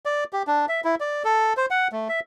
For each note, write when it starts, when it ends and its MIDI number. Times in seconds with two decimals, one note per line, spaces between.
0.06 0.24 74
0.33 0.43 67
0.47 0.66 62
0.69 0.81 76
0.84 0.95 64
1.00 1.23 74
1.25 1.53 69
1.57 1.66 72
1.71 1.88 78
1.92 2.08 57
2.09 2.20 76